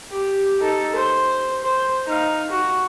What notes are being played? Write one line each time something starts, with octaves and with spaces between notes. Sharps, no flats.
G4
D#4 A4
C5
C5
D#4 F5
F#4